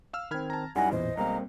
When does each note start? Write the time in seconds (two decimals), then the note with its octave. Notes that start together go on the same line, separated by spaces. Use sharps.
0.13 F5 E6 F6
0.31 D#3 C4 B5 F6 G#6
0.50 A5 A#5
0.76 F#2 G3 D#4 E4 F#5 G#5 A#6
0.92 A1 E2 A#2 E3 C5 D#5
1.17 B1 G3 G#3 A#3 C4 F5 A#5